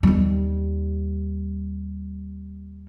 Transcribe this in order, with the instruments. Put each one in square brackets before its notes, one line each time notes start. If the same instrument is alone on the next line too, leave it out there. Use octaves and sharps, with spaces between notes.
[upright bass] D#2 G3